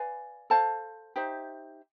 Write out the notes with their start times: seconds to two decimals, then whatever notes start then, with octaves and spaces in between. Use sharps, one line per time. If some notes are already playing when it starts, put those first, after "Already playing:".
Already playing: B4 D5 F5 G#5
0.50 A4 C5 F5 A5
1.16 D#4 G4 C5 E5